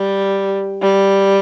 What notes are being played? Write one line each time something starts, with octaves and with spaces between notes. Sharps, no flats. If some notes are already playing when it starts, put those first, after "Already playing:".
Already playing: G3
G3